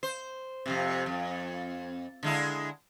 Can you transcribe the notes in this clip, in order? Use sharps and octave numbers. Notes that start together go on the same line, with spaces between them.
C5
F2 A2 C3
F2
D3 G#3 E4